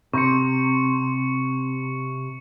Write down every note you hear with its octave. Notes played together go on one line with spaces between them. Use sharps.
C3 C#6 C#7